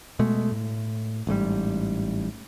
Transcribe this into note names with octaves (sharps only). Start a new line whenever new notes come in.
B2 G#3 A3
A2
A1 G#2 C3 G3